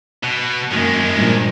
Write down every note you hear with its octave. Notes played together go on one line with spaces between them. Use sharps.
B2
F#2 D#3 G#3 A#3
G2 A#2 F3